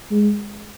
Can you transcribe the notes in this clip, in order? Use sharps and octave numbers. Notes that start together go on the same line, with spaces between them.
G#3